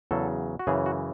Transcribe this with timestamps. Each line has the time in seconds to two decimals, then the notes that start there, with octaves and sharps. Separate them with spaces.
0.11 E2 C#3 F#3 A4
0.59 F#4
0.67 F#2 C#3 E3 G#4
0.86 F#4